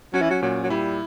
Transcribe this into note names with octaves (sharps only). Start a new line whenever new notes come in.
F#3 C#4
E3
F#3
A#2 F#3
F#3
G3 E4